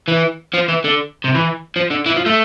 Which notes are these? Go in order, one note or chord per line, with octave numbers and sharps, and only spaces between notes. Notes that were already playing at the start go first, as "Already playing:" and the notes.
E3
F3
E3
D3
C3
E3
F3
D3
E3
F3
A3